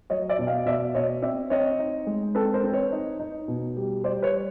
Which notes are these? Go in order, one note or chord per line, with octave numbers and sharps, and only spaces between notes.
F#3 C#5 D#5
D5 E5
B2
D#5 F5
B2 D5 E5
B2 C#5 D#5
C4 D5 E5
C4 C#5 D#5
D#4
G#3
C4 A4 B4
A#4 C5
C4
B4 C#5
D#4
D#4
B2
G3
G3 C5 D5
B4 C#5
G3